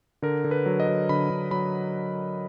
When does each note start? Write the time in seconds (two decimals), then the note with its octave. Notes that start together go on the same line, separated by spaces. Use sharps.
0.22 D3 A#4
0.44 D3
0.51 B4
0.66 F#3
0.80 D#5
0.88 F#3
1.09 D3 B5
1.30 D3
1.51 F#3 B5